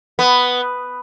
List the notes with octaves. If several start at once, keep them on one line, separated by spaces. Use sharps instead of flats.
B3